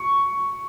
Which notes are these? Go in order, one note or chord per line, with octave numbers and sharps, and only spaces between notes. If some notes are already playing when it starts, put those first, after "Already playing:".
Already playing: C#6